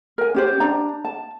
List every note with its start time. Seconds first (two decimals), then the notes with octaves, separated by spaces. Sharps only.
0.18 A#4 G#5
0.35 C#4 G4 C5
0.60 D4 A#5
1.05 A5